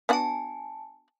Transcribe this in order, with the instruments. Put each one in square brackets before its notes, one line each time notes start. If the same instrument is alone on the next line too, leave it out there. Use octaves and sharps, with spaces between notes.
[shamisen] B3 D4 F#4 [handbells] G#5 A5